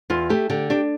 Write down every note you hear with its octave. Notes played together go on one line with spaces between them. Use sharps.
E2 F4
A3 G4
D3 G4
D4 G4